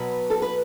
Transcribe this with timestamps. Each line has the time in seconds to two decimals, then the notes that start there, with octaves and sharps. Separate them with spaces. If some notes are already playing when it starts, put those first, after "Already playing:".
Already playing: B2 F#3 B4
0.30 A4
0.42 B4